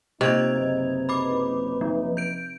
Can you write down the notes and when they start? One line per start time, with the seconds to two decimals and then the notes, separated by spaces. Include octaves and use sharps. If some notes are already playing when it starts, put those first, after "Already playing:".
0.21 C3 A#3 D#4 F4 D#5 G#6 F7
0.57 F#1 D#4 B4
1.09 B5 D6
1.81 F3
2.17 G6 D7